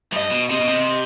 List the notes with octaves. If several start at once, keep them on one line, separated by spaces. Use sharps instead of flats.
G2 D#5
B2
C3 D#5
B2
C3